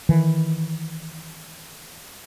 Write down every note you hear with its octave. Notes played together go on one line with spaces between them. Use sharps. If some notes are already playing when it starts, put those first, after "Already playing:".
D#3 E3